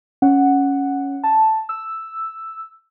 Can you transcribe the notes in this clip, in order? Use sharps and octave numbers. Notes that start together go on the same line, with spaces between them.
C#4 F#5
A5
E6